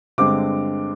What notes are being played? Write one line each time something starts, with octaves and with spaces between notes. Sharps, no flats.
G2 D3 G#3 C4 D6